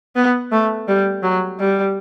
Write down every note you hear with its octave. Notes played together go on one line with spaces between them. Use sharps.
B3
A3
G3
F#3
G3